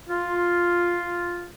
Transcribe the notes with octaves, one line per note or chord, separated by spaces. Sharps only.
F4